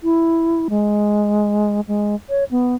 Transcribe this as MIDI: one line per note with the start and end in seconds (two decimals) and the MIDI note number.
0.03 0.68 64
0.70 1.81 56
1.88 2.15 56
2.30 2.44 73
2.51 2.75 59